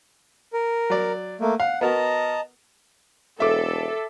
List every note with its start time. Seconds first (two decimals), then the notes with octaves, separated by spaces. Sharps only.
0.53 A#4
0.90 F#3 D5
1.41 A3 A#3
1.60 F5 F#5
1.81 B3 F#4 A#4 D#5 A5 A#5
3.40 E1 A4 E5 D6